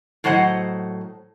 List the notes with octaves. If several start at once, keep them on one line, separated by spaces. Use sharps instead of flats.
A2 F#3 C5 D#5 F#5